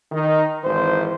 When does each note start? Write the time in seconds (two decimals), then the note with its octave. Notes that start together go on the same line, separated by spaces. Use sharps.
0.12 D#3 D#4
0.64 G#1 E3 C5